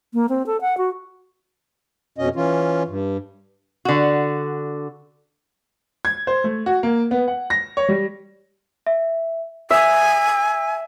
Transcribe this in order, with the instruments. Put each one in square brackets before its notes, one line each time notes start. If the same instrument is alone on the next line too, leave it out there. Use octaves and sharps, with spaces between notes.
[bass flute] A#3
C4
A4
F#5
F#4
[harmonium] F2 B2 C#4 D#5
E3 C#4 F4
G2
[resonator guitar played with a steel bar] D3 F#4
[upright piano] G#6
C5
A3
F#4
A#3
B3
F#5
A#6
C#5
G3
[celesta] E5
[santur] E5 [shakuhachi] G#5